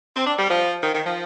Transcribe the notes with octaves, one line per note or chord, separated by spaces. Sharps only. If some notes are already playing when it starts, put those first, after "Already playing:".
C4
D4
G3
F3
D#3
D#3
F3